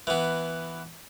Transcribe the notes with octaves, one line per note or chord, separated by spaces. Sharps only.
E3 B3